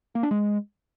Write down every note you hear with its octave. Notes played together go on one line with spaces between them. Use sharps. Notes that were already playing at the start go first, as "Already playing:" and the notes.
A#3
D4
G#3